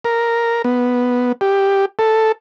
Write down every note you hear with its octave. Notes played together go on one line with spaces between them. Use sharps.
A#4
B3
G4
A4